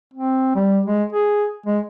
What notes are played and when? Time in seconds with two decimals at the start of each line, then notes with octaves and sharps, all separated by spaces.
0.14 C4
0.55 G3
0.86 G#3
1.13 G#4
1.66 G#3